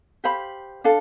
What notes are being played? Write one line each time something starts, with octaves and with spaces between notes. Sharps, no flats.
G4 C5 F5 B5
D4 A4 F5